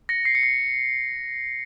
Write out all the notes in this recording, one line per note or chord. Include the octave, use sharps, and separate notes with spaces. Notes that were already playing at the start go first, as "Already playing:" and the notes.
A#6 C#7
C7
C#7
C7